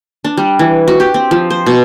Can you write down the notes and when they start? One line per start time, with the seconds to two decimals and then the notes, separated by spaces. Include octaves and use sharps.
0.24 D4
0.37 G3
0.59 E3
0.88 F#4
1.00 G4
1.14 C4
1.31 F3
1.50 C5
1.66 B2